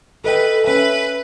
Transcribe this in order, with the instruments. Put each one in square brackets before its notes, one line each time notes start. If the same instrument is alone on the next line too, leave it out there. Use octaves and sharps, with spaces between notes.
[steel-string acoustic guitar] A4 D#5 G5 [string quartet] B4
[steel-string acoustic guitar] C#4 E5 [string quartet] B4